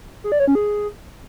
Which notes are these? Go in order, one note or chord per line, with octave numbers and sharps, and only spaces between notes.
G#4
D5
C#5
C#4
G#4